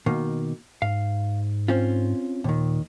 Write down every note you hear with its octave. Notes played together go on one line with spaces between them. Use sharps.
B2 D#3 A#3
G#2 F5
C4 C#4 F4
D#2 A#2 D#3